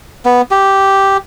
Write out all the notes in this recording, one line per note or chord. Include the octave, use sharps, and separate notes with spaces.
B3
G4